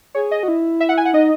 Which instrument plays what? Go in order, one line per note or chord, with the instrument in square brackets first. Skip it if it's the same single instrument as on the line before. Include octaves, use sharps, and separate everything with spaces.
[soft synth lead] G#4 [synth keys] C#5
[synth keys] D#5
[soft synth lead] F#4
E4
[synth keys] E5
F#5
G#5
F#5
[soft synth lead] D#4 [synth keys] D#5